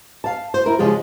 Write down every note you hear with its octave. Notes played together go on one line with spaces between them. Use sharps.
F5 A5
C5
E4 A#4
C#3 F3 G#3 F4 G4